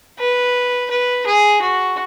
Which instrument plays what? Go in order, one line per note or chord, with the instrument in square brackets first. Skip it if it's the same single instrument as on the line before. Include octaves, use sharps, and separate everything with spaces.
[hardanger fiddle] B4
B4
G#4
F#4